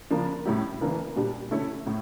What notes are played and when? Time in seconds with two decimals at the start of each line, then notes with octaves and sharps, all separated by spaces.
0.10 C#3 F3 A#3 D4
0.45 A2 G3 C#4 E4 G4
0.80 C#3 E3 A#3 D4
1.16 A#2 G3 D4 G4
1.51 D3 A3 C#4 E4
1.86 A2